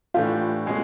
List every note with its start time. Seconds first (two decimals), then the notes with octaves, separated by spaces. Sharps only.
0.14 A2 E3 A3 D4 F4 G4
0.66 B2 G#3 C#4